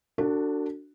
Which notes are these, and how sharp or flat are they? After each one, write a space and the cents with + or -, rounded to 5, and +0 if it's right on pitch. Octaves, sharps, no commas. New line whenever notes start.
D4 +0 F#4 +0 A4 +35